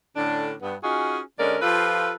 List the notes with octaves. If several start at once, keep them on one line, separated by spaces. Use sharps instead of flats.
A2 D3 C#4 D4
G2 B3
C#4 D#4 F4 F#4 G#4
D3 G#3 C#4 A#4 D5
F3 F4 G4 A4 B4